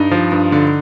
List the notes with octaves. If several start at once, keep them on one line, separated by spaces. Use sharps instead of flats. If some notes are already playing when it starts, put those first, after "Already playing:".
Already playing: G2 D#4
F3
G2
D3